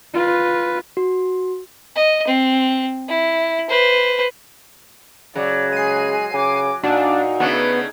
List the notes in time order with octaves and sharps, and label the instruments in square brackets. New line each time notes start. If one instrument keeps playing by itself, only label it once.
[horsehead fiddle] F4 B4
[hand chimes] F#4
[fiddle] D#5
C4
E4
B4 C5
[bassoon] C#3 [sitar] F#3 [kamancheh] D5
[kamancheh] G#3 G#4 [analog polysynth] C7 D#7
[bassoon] C#3 [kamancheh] G#5 D6
[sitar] A#2 [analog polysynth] D4 [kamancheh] D#4 [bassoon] F#4
[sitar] C#3 A3 D4 [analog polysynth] B3